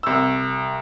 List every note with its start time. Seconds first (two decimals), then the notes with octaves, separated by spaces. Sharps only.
0.03 C2 E6